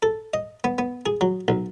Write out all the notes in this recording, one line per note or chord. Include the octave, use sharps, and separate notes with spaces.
A4
D#5
B3
B3
G#4
F#3
B1